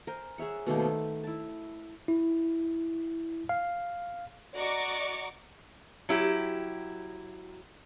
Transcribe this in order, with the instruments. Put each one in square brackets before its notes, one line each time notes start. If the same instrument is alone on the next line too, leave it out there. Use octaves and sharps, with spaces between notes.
[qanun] A#4 C5 G#5
G#4 C#5 E5 F#5
B2 D#3 A3 A#3
C5 B5
E4 A5
[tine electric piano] E4
F5
[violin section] F#4 D5 D#5 A#5 C#6 D6
[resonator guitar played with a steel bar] F#3 E4 G4